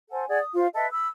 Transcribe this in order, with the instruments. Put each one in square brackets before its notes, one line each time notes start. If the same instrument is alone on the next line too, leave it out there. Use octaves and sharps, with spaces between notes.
[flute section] A4 C5 F#5 G#5
G#4 D5 F#5
D#6
F4 C5 F5
A4 B4 D#5 E5
B5 E6